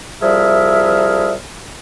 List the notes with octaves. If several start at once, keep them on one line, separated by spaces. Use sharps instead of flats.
C2 F3 G3 G#4 A#4 E5